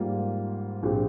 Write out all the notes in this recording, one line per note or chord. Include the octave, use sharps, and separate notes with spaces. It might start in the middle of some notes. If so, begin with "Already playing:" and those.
Already playing: G#2 G3 A#3 F4
A#1 A#2 G#3 C4 G4